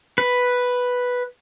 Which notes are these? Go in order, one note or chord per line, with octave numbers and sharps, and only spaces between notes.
B4